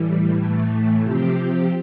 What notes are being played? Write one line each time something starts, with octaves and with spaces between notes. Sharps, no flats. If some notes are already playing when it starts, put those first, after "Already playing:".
Already playing: A2 E3 G3
A2 E3 A3
C3 F3 C4 G4